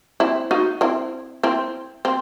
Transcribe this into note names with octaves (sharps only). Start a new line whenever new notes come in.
C4 E4
D#4 F#4
C4 E4
C4 E4
C4